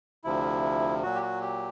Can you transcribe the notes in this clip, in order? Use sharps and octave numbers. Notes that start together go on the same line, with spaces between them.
D2 C3 F3 E4
A#2 F#3 F#4
G4
F#4
G4